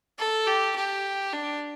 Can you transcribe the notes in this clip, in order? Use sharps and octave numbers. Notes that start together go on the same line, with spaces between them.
A4
G4
G4
D4